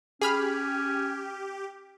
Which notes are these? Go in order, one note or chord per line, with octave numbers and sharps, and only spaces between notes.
C#4 G4 G#4 B5 F6